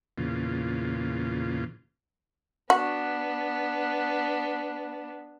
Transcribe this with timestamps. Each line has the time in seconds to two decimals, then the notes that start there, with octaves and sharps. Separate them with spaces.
0.18 E2 A#2 C#3 F4
2.70 B3 D4 F#4